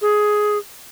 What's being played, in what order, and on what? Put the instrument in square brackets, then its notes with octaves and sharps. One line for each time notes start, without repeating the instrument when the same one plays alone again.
[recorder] G#4